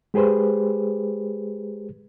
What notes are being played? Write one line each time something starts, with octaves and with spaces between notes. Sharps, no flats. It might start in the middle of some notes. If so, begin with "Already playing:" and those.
G#3 G4 G#4 B4 C5